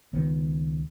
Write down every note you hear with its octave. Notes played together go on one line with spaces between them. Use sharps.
C#2 D#3 B3